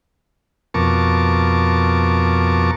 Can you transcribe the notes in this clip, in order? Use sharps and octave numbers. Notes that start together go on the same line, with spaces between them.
F2 B2 A#4 A5 C#6 D6